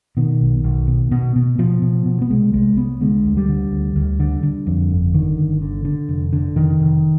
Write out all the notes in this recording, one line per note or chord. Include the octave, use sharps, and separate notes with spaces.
B2 D#3
B1
B1
B2
B2
B2
B2 F3
B2
B2
B3
C2 G#3
C2 G#3
C2 B3
D3 G#3
D2
G3
D3
D2
D2
D3
D3
F2
G1
D3 D#3
G1
D3
D3
F1
D3
F1 D#3
F1